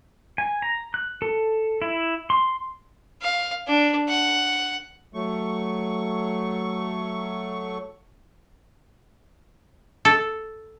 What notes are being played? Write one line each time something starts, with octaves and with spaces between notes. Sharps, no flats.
G#5
A#5
F#6
A4
E4
C6
F5
D4
F#5
F#3 A3 C#6
A4